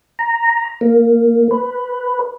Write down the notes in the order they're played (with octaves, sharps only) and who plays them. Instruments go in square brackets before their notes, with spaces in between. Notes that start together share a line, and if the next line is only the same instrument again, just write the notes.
[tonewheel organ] A#5
A#3
B4